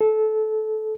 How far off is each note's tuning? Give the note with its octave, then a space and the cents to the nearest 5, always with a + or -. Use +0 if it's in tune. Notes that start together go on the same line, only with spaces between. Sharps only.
A4 -20